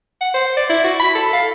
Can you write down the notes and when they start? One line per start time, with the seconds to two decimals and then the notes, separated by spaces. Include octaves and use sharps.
0.21 F#5
0.34 C5
0.57 D5
0.69 E4
0.84 F#4
0.99 B5
1.15 A4
1.33 F5